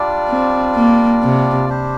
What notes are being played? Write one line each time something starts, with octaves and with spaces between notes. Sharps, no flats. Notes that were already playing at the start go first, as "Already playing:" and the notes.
Already playing: G3 D4 F4 D5
C4
A#3
C3
G3 D4 G4 C5